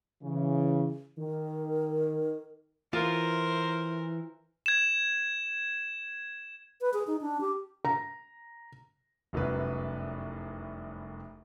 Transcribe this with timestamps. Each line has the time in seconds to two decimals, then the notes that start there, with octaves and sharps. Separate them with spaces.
0.22 C#3 E3
1.18 D#3 A#4
2.93 E3 F4 A#4 C5
4.66 G#6 E7
6.81 B4
6.94 G#4
7.07 D#4
7.21 D4
7.41 G4
7.85 A#5
9.33 F1 C2 F#2 B4